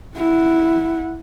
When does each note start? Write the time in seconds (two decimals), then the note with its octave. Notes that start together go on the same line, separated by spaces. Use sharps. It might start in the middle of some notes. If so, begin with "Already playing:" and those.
0.16 E4 F#5